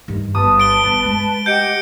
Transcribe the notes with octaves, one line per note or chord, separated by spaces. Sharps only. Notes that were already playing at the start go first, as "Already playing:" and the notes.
G2 D#3
G1 B4 A5 D#6
D7 G7
G1
G#3
G4 D#5 F#5 G6 C#7 D7